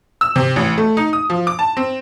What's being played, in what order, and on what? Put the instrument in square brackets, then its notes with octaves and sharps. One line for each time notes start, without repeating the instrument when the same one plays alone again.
[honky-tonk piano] E6
C3
A1
A3
D#4
D#6
F3
D6
A5
C4